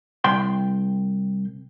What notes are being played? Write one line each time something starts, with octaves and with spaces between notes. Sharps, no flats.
C2 G5 C6